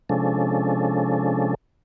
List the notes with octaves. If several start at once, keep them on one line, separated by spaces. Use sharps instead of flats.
C3 F3 G#3 C#4 D4 A4